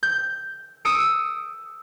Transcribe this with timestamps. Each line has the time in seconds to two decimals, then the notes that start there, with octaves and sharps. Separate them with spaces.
0.03 G6
0.85 D#6 E6 C#7 D7